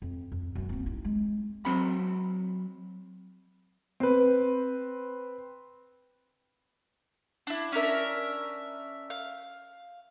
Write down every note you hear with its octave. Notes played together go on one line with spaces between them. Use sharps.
F2
F2
F#2 A#3
A#3 C4
D#4 E4
G#3
F#3 C4 B5
C4 B4
D4 E4
C#4 D4 A#4 E5
F5